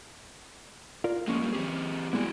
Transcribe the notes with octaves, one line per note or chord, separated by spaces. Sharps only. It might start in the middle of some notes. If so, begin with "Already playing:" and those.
F4 A#4 D5
F3 G#3 A#3 C#4
F#2 G3
E3 C4 G4 G#4
G3 G#3 B3 E4 F#4